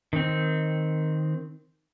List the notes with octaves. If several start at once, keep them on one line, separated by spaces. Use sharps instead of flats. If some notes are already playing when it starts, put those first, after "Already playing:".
D#3 C4